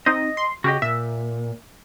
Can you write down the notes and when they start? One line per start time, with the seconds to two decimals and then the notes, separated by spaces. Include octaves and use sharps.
0.06 C4 D#4 D#5
0.37 C6
0.64 C#3 F#4 G4 D#5
0.82 A#2 E5